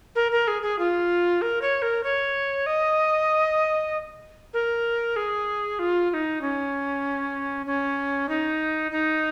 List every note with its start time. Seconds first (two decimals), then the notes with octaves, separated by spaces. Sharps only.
0.15 A#4
0.32 A#4
0.48 G#4
0.62 G#4
0.79 F4
1.42 A#4
1.62 C#5
1.82 A#4
2.04 C#5
2.66 D#5
4.53 A#4
5.16 G#4
5.79 F4
6.10 F4
6.14 D#4
6.41 C#4
7.66 C#4
8.29 D#4
8.92 D#4